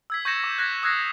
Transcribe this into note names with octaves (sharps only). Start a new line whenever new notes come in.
E6 G#6 B6
C#6 G6 G#6 A#6 C#7 E7
D6
F#6 G#6 A#6 B6
D#6 E6 F#6 G#6 A#6 C7